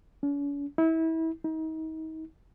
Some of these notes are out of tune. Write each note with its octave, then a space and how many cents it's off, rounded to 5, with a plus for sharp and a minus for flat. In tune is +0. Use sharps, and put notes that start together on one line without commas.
C#4 +45
E4 -30
D#4 +35